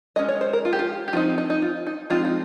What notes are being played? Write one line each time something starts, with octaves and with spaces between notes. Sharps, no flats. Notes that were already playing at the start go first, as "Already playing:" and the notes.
G#3 C#4 D#5
C#5
C5
A#4
F4
G4
F4
G4
F3 C4 D#4 F4
D#4
D#4
F4
D#4
F3 G#3 C4 D#4 F4
D#4